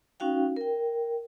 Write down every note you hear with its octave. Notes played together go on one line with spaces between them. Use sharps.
C#4 D#4 F#4 F5 G5
A#4 G5